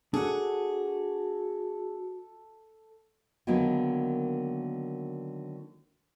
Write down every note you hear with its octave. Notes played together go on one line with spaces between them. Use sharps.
D4 F#4 G#4 A4 F#5
D3 D#3 F#3 G#3 A#3 B3